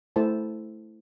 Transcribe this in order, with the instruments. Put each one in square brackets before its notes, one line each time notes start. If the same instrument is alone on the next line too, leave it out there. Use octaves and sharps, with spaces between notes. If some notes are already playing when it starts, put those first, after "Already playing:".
[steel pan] A3 E4 A4 C5 A5